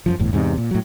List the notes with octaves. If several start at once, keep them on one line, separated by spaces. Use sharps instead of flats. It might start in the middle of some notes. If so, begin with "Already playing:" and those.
F#2 D3 F3
G1 E2 A2
E2 G#2 C3
A#2
A2 F#3